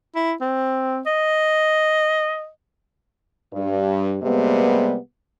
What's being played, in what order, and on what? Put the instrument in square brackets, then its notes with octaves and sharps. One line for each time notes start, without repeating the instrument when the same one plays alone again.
[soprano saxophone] E4
C4
D#5
[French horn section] G2
C3 G3 G#3 A#3 B3